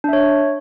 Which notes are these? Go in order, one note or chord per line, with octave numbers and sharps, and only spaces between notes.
D4 C#5 E5